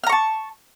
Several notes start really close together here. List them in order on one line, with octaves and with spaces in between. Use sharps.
F6 A#5 C#6 A5